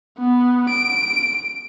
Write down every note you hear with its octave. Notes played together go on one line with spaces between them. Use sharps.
B3
D7